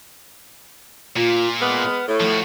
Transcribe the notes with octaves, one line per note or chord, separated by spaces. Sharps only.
A#2 F4
G#3 B3 F6
A2
F3 A3 F#4